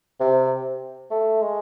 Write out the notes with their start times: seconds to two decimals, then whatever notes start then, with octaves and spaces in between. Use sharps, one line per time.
0.20 C3
1.10 A3
1.41 G#3